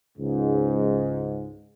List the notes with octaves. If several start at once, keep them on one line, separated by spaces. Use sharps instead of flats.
C#2 G#2